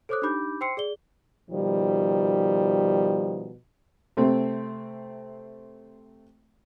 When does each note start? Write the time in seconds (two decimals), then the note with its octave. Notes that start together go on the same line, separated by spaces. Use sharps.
0.09 A4 C5 C#5 D6 D#6 F#6
0.22 D4 D#4 G4 B5 D6 G6
0.61 C5 G5 C6 E6 C7 C#7
0.77 G#4 D5 G7
1.51 B2 D#3 F3 G3
4.17 C3 A3 C4